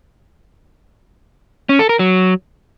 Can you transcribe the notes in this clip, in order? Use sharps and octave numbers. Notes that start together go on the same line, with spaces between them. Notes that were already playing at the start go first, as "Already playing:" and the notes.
C#4
A4
A#4
F#3